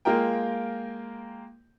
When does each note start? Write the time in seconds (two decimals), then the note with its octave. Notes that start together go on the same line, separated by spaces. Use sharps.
0.05 G#3 A#3 F4 A#4 G5